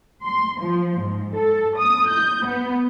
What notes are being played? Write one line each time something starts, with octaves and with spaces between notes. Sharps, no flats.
C6
F3
G#2
A4
D#6
G6
B3